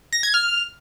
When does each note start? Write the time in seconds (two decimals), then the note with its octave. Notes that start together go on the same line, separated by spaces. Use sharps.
0.13 A#6
0.23 G#6
0.34 F6